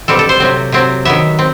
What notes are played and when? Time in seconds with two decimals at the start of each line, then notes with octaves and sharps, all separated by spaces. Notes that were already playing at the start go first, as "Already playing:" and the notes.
0.08 B2 G3 C4 A4
0.19 A4
0.29 C5
0.40 C3 F#3 C4
0.72 C3 F#3 C4
1.05 D#3 F#3 B3 E5
1.39 C4